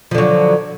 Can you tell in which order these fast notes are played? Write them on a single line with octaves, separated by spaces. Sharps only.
F3 D3 F#3